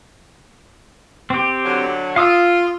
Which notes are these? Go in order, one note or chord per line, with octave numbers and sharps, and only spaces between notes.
C4 G4
D3 F#3
F4 F5 D#6 E6